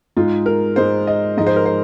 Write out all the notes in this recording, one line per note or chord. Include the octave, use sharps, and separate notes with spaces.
G#2 G#3 F4
A#4
G#2 G#3 C5
D#5
G#2 F3 G#3 D#5
C5
A#4
C5